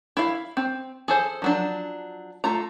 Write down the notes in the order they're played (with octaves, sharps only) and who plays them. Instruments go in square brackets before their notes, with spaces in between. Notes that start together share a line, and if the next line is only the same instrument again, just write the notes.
[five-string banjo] E4 F5
C4
G#4 A4 C5 G#5
F3 F#3 D4
A3 F4 A#5